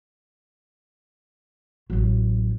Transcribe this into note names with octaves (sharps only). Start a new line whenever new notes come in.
A1 F#3